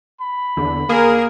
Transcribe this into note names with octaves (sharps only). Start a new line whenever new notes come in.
B5
E2 D3
A#3 G#4 A#4